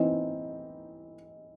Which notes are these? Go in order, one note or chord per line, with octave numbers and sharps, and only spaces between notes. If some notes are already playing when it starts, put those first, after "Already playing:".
Already playing: E3 C4 D#4